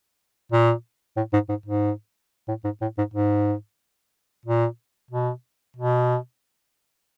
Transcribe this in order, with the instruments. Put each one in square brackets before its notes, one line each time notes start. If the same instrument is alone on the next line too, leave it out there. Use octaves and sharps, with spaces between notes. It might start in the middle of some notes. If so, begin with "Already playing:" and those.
[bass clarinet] A#2
A2
G#2
G#2
G#2
A2
G#2
A2
G#2
G#2
A#2
B2
B2